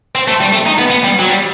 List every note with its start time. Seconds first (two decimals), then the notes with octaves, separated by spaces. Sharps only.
0.15 C4
0.28 A3
0.40 G3
0.53 A3
0.66 D#4
0.79 B3
0.90 B3
1.04 G3
1.19 F#3
1.29 G3